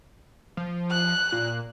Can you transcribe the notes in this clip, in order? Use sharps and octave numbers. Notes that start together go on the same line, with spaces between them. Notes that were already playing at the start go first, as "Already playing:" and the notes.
F3
F#6
A#2